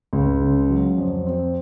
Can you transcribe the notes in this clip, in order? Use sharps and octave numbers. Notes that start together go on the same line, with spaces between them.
C#2
C#3
F#3
F2
C4